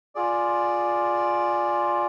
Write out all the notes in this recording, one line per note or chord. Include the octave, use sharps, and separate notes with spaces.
F4 G#4 D5